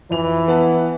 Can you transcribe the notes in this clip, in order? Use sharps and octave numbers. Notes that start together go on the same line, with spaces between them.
F2 E3 F7
B3 F#5 A5